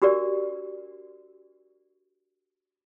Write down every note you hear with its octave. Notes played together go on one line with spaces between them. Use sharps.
D4 F#4 G4 A#4 D5